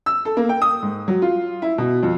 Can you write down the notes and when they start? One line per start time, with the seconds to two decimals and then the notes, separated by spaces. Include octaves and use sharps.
0.06 E6
0.25 A4
0.37 A#3
0.49 G5
0.62 D#6
0.82 G#2
1.08 F#3
1.22 F4
1.62 E4
1.78 B2
2.03 F2